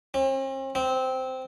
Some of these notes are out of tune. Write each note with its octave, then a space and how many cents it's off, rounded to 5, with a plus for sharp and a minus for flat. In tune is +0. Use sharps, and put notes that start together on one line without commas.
C4 +45
C4 -10